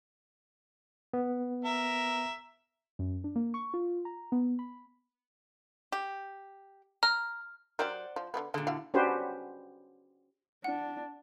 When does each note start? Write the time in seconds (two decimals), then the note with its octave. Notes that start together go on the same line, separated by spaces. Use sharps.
1.13 B3
1.65 A#4 E5
2.99 F#2
3.24 D4
3.36 A#3
3.54 C#6
3.74 F4
4.05 A#5
4.32 B3
4.59 B5
5.92 G4
7.03 A#5 F6
7.79 F#3 G4 A#4 C5 D5 F#5
8.16 F3
8.34 D3 G#3 B3
8.54 A#2 D3 G#3 A4
8.67 E4 F#4 F5
8.94 C#4 D4 F#4 G4 B4 C5
10.64 D4 F#5